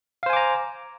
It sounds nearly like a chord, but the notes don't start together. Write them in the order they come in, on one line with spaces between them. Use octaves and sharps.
F5 C5 G#5 D6 A#5